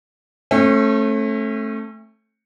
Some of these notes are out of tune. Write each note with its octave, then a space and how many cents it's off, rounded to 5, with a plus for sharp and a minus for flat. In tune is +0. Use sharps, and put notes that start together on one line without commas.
A3 +0 C#4 -40